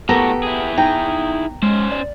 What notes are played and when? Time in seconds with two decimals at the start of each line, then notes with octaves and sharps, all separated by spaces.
0.09 A2 B3 F#4 G4 A4 A#4
0.43 E4 G#4
0.78 D#4 G5 A#5
1.63 G#3 C#4 C5
1.92 D5